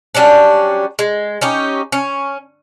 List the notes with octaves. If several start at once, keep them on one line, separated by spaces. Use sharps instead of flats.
F#3 G3 C#4 D4
G#3
C#4 D#4 G4
C#4